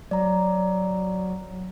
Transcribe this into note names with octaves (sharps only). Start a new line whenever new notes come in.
F#3 D5 A#5